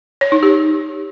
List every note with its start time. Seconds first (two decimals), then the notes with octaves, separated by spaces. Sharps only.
0.21 C#5
0.32 D#4
0.43 G4